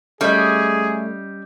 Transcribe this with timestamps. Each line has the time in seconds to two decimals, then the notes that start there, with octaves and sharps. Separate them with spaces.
0.21 G3 A3 C#4 G#4 D5 D#5